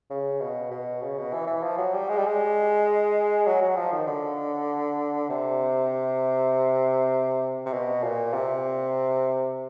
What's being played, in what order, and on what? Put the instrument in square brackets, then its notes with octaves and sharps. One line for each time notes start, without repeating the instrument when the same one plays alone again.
[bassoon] C#3
B2
B2
C#3
B2
E3
E3
F3
F#3
G3
G#3
G3
G#3
F#3
F#3
F3
D#3
D3
C3
C3
B2
A#2
C3